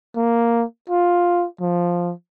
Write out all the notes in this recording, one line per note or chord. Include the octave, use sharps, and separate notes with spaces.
A#3
F4
F3